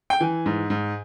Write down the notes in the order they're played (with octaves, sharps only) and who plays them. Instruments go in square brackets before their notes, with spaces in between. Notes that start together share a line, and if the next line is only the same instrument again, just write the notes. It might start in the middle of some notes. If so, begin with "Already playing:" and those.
[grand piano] G5
E3 G#5
G#2
G#2